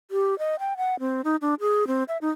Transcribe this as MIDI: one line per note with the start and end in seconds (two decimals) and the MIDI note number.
0.11 0.37 67
0.39 0.56 75
0.59 0.77 79
0.77 0.99 78
1.00 1.21 60
1.24 1.36 63
1.41 1.54 62
1.60 1.87 68
1.87 2.04 60
2.08 2.18 76
2.21 2.30 63